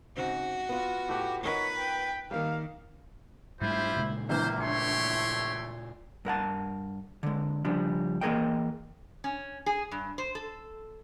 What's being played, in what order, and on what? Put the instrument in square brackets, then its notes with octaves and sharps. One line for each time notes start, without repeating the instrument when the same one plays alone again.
[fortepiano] G#2 C#3 C4 [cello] F#4
[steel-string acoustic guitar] B3 F4
[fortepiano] A2 A3 F#6 [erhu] G4
[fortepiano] D#4 A#4 F#5 [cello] B4 [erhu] C#5
[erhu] G5
[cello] D#3 [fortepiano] G3 A#3 [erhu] F5
[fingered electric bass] G#2 G3 A3 [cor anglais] E4 [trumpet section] F4 G4 C5
[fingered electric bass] A#2 C#3 G#3
[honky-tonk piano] A#1 D3 E3 [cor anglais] A#3 [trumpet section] C5
[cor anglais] A3 [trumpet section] G4 C#5 C6
[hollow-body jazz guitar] G2 A#4 F#5 A5
D3 G#3
C#3 F3 G3 D4
E3 A#3 G#4 A#4 D#5 G5
[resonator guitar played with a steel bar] C#4
G#4
G2
C5
A4